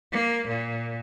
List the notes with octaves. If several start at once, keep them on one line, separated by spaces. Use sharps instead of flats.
A#3
A#2